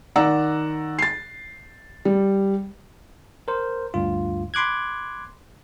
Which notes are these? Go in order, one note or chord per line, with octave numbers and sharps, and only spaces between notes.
D#3 D5 F#5 A#5 E6
A6 C7
G3
A#4 C5
D2 G2 F4
B5 C6 D6 F#6 G#6